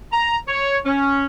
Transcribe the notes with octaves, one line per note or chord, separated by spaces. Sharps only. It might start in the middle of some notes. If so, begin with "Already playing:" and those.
A#5
C#5
C#4